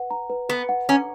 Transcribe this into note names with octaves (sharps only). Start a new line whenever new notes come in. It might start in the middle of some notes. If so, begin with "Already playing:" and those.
Already playing: B4 F#5
A#5
B4
B3 B4
F#5
C#4 A#5